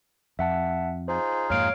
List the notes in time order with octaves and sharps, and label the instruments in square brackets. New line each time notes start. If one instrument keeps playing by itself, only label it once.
[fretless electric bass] F2 [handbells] E5 F#5 A5
[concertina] D#4 F4 G#4 [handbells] C5
[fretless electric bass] F2 G#2 A#3 [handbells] C#5 D7 [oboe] F5